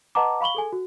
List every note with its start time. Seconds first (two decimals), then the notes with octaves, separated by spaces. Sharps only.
0.15 B4 D#5 F#5 A5 A#5 D6
0.41 F5 B5 C#6 F#7 G7
0.55 G#4 A4 G#5
0.72 F#4